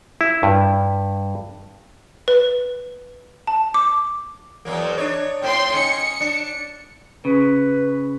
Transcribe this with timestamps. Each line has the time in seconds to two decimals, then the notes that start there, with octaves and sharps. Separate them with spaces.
0.21 E4
0.43 G2
2.28 B4
3.47 A5
3.74 D6
4.65 E2 F#3 A#3
4.98 D4 D#4 C#5
5.42 A2 C4 G5 C6
5.74 C#4 D#4 C#7
6.21 D4
7.25 C#3 B4